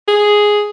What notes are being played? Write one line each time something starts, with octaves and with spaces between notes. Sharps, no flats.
G#4